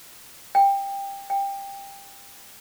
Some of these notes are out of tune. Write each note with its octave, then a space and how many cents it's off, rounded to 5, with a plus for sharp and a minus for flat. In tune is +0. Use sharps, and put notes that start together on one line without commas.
G5 +15
G5 +15